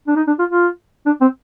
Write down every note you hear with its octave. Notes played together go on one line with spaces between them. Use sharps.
D4
D#4
D4
F4
F4
D4
C4